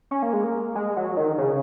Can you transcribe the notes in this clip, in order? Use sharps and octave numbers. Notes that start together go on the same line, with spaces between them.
C#4
A#3
G#3
A#3
G#3
F#3
D#3
C#3